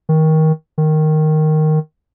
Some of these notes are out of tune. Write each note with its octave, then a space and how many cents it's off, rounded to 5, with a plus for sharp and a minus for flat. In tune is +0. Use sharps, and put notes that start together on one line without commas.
D#3 +20
D#3 -5